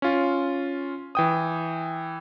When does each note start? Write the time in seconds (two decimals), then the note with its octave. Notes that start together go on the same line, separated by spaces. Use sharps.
0.02 C#4 F4
1.15 E3 G5 D#6